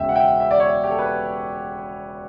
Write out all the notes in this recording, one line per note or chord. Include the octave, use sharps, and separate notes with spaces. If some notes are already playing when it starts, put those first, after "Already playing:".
Already playing: E1 E2 C#3 E5 G5
F#5
E5 G5
E5
D5
C#5 E5
G4
A4
B4